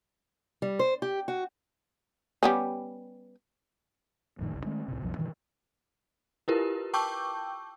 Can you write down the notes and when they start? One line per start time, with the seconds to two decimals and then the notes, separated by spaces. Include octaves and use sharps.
0.62 G3
0.79 C5
1.02 G4
1.28 F#4
2.43 G3 B3 C#4
4.39 A1 F2 A2 D#3
4.52 F#1 C2
4.66 D#3 G#3 A3 C#4
4.88 C2 A2 C3
5.02 B1 F2 F3 F#3
5.17 G2 B2 D#3 E3
6.48 E4 F4 G4 A#4 B4
6.94 G5 A5 C#6 D6 E6 G6